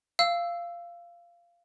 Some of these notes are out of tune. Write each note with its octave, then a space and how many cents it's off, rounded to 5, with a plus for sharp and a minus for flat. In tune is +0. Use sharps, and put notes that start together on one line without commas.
F5 -15 E6 +0